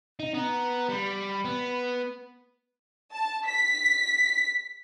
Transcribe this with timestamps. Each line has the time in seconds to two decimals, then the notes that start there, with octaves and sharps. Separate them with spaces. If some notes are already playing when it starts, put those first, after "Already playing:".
0.20 D#4
0.34 B3 A#5
0.89 G3 B5
1.45 B3
3.13 A5
3.47 B6